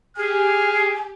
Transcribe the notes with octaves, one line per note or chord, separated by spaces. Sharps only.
G4 G#4 G#5 F6